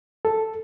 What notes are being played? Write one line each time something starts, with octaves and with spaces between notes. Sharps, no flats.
A4